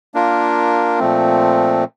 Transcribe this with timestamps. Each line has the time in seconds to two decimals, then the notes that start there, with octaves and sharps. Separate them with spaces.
0.14 A#3 D4 F4 A#4
0.99 A#2 F3 A3 C4